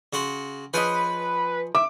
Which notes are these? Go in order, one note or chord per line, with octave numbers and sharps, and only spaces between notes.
C#3 F#4 C6
F3 G#4 B4 C#5 D#5 G#5
E5 D6